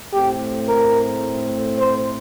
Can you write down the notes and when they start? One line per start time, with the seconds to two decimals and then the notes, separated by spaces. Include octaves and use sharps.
0.14 A2 A3 C4 G4
0.69 A#4
1.79 C5